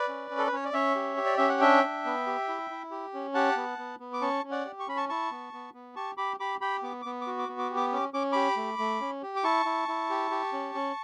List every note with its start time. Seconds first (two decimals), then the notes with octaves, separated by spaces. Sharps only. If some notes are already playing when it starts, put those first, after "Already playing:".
Already playing: B4 D5
0.08 C#4
0.31 C#4
0.38 A4
0.47 B4
0.52 C#4 C#5
0.65 D5
0.73 C#4 C#5 E5
0.95 G4
1.17 G4
1.26 D5
1.38 C#4 E5
1.49 F#5
1.60 D4 E5 G5
1.83 D4
2.05 B3
2.27 G4
2.48 E4
2.70 E4
2.91 G4
3.14 C#4
3.35 G4 F#5 A5
3.57 B3
3.78 B3
4.00 B3
4.13 D6
4.22 C#4 A5 C#6
4.44 C#4
4.51 D5 F#5
4.65 G4
4.80 C#6
4.88 C#4 B5
4.97 A5 C#6
5.09 E4 A5 C#6
5.31 B3
5.53 B3
5.74 B3
5.96 G4 A5 C#6
6.17 G4 B5 D6
6.40 G4 B5 D6
6.61 G4 G5 B5
6.83 B3 D6
7.02 B3 D6
7.21 D6
7.27 F#4
7.39 D6
7.49 B3
7.59 D6
7.70 G4
7.76 D6
7.93 C#4 D6
8.14 C#4 D6
8.32 G4 B5 D6
8.57 A3
8.79 A3
9.01 C#4
9.22 G4
9.36 D6
9.44 E4 A5 C#6
9.66 E4
9.88 E4
10.10 G4
10.31 G4
10.53 C#4
10.75 C#4